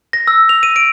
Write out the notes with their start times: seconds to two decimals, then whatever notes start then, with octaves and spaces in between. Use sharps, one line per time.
0.13 A#6
0.27 E6
0.49 F7
0.63 D#7
0.76 D7